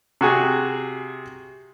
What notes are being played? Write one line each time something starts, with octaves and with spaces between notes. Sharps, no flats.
C3 F#4 G#4